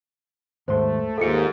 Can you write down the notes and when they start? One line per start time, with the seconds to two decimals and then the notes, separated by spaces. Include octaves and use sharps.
0.68 D#2 G#2 A3 C5 C6
1.18 D#2 G#2 F4 A4 D#5 E5 C#7